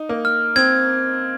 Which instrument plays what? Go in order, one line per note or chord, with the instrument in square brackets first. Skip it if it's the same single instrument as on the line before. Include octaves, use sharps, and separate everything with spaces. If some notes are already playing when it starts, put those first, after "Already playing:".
Already playing: [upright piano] D#4
A#3
[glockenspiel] F6
[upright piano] C4 [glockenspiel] G#6